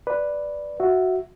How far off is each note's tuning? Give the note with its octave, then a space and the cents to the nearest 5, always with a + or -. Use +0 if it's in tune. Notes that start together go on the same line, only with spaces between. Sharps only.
B4 +0 D5 +0
F#4 +0 E5 +0